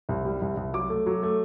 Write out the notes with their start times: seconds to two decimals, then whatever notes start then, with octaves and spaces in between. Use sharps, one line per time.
0.09 C2
0.25 G3
0.42 C2
0.57 C2
0.73 F#3 D6
0.90 A3
1.06 F#3
1.23 A3